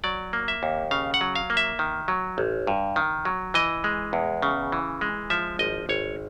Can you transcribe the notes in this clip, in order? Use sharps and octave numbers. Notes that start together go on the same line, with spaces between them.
F#3 D5
A#3
E5
D#2
C#3 F5
F#5
F#3
F5
A#3
E5
D#3
F#3
A1
G2
D#3
F#3
E3 D#5
G#3
E2
C#3
E3
G#3
F3 E5
G#1 D#5
G#1 C#5